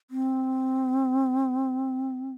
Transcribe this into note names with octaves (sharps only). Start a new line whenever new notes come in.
C4